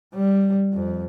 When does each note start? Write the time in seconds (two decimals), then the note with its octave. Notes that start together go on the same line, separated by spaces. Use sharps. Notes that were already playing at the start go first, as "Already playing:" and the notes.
0.15 G3
0.73 F2